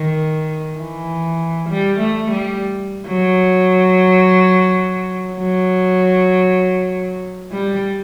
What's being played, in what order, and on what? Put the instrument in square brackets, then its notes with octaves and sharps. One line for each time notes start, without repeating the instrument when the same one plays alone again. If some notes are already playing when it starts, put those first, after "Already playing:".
Already playing: [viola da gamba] D#3
E3
G3
A3
G3
F#3
F#3
G3